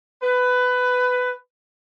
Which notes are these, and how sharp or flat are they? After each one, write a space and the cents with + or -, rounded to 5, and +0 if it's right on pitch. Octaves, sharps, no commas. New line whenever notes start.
B4 +15